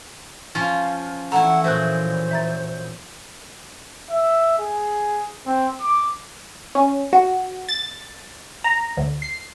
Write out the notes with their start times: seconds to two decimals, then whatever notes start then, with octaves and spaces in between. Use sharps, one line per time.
0.55 F3 C#4 F4
1.32 E3 F3 A3 E4 F#5 A#5
1.64 A#2 F#3 C5 E5 F#6
2.31 E5 A#5 A6
4.11 E5
4.59 G#4
5.46 C4
5.82 D6
6.75 C#4
7.13 F#4
7.69 A6
8.64 A#5
8.97 D2
9.22 C7